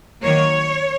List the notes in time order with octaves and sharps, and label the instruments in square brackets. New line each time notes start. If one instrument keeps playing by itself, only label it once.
[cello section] D#3 F#3 A#3 C#5